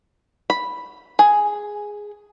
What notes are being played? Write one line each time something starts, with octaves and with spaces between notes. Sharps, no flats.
B5
G#4